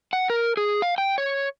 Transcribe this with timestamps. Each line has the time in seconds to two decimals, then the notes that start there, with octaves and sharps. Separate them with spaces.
0.13 F#5
0.30 A#4
0.57 G#4
0.82 F5
0.98 G5
1.18 C#5